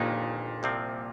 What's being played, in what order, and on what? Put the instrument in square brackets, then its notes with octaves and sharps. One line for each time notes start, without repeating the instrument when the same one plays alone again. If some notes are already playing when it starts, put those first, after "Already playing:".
Already playing: [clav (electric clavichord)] G1 F2 D#3 G#3 D#4 [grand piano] A#2
[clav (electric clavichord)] C2 C3 F3 C4